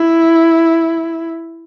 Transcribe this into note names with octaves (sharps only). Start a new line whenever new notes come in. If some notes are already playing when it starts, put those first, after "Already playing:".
Already playing: E4